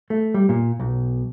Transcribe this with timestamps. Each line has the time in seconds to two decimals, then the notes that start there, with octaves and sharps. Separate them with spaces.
0.10 A3
0.34 G3
0.49 A#2
0.80 B1